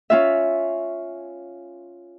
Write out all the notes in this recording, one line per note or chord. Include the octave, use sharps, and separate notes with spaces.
C#4 F4 E5